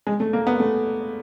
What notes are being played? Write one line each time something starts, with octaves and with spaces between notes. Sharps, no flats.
G#3
A3
A#3
B3
A3